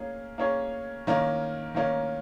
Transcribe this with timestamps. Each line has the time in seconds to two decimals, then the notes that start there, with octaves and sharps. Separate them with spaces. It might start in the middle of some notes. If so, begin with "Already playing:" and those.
Already playing: A#3 C#4 G#4
0.38 A#3 C#4 G#4 C#5
1.07 D#3 A#3 C#4
1.74 D#3 A#3 C#4